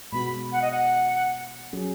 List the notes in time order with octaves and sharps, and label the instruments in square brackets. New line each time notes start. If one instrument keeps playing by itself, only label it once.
[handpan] B2 G#3 B3 F#4 [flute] B5
[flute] F#5
D#5
F#5
[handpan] F#3 C#4 G#4